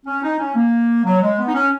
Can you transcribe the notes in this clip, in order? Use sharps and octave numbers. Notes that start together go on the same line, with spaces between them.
C#4
D#4
C#4
A#3
F#3
G#3
B3
D#4
C#4